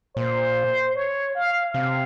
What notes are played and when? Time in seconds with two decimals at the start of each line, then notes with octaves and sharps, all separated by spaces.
0.16 A#2 C5
0.95 C#5
1.35 F5
1.74 C3 F5